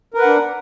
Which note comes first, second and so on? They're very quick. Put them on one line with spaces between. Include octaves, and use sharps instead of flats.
A#4 B4 F#5 D4